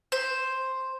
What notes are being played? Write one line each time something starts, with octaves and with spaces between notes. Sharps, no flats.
C5